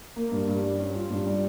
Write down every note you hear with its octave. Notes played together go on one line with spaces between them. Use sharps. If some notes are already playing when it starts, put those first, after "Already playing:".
A#3
G2
G2
G3
C#4
F4
G2
G3